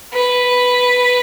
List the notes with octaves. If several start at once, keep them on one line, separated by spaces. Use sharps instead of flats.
B4